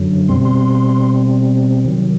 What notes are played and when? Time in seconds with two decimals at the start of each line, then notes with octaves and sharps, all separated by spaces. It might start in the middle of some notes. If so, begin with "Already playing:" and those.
Already playing: F#2 D3 F#3
0.29 B2 G3 C4 C6
0.45 C6
1.85 C3 D#3 F#3